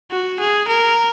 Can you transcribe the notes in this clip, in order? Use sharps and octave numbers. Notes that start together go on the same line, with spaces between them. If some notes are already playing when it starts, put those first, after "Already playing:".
F#4
G#4
A#4